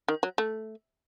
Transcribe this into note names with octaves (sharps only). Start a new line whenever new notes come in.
D#3
F#3
A3